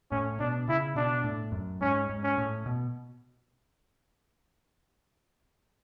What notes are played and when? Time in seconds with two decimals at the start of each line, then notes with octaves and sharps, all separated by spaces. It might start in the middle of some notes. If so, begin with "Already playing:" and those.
0.11 A2 C#4
0.40 B2 D4
0.68 C#3 E4
0.96 B2 D4
1.24 A2
1.52 F#2
1.81 G#2 C#4
2.10 G#2
2.23 C#4
2.38 A2
2.66 B2